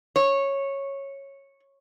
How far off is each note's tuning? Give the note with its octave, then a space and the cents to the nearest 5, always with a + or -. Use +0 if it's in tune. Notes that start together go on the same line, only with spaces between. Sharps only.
C#5 -10